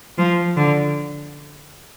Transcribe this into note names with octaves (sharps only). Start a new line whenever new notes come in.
F3
D3